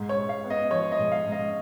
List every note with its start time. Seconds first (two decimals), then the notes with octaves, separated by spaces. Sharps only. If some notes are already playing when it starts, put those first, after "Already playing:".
Already playing: G#2
0.09 C#5
0.16 G#2
0.29 F5
0.44 B3
0.50 D#5
0.71 F3 C#5
0.92 D#5
0.98 G#2
1.12 F5
1.26 G#2
1.32 D#5